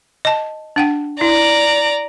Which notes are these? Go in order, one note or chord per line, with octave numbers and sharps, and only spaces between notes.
D#5 A5
D4 F#5 G5
E4 D5 A#5